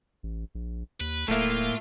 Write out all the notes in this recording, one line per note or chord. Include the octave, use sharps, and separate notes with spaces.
A1
A#1
D#2 B4
D1 A2 A3 A#3 F4 E5